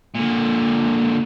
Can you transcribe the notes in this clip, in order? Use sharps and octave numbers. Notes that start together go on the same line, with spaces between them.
A#2 D3